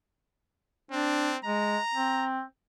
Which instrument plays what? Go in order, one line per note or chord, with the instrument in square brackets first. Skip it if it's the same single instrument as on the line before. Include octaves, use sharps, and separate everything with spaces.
[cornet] C4 [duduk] D4
[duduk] G#3 [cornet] A#5
[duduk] C4